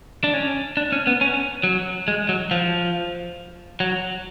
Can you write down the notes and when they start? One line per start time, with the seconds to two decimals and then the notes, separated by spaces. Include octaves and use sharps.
0.24 D4
0.34 C#4
0.77 D4
0.92 C#4
1.07 B3
1.21 C#4
1.63 F#3
2.08 G#3
2.29 F#3
2.51 F3
3.80 F#3